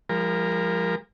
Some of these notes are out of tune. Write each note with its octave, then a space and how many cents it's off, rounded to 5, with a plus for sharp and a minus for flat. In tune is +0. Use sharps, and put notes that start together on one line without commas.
F3 +0 G#3 -45 A#4 +0